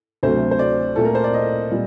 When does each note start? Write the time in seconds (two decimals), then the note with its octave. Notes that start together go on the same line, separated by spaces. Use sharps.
0.23 D2 C3 F#3 A3 C5
0.51 C5
0.59 D5
0.96 A#2 A3 C4 A4
1.05 A#4
1.15 C5
1.24 D5
1.34 D#5
1.70 A#2 G3 C4